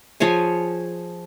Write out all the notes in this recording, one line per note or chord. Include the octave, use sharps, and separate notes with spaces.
F3 G#4 C#5 G#5